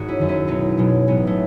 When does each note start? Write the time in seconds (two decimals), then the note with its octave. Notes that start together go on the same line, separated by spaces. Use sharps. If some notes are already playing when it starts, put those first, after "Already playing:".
Already playing: G#1 F#4 G#4
0.08 C#4 E4
0.19 F#2 D#3
0.28 C#4 E4
0.48 B1 B3 D#4
0.77 B2 F#3 G#3
1.07 A1 G#3 B3
1.27 F#3 A3